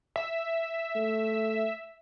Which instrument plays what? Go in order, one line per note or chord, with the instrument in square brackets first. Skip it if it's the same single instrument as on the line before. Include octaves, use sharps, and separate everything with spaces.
[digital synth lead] E5
[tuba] A3